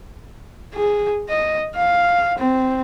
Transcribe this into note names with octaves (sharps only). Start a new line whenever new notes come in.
G#4
D#5
F5
C4